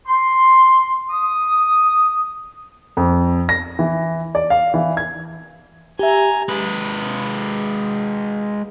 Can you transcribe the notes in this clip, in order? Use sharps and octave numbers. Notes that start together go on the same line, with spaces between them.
C6
D#6
F2
A#6
E3
D5
F5
E3
G#6
G4 E5 G#5 A#5
G#3 B4